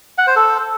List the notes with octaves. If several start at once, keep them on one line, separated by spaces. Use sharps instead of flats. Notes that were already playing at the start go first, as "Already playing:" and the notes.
F#5
C5
A4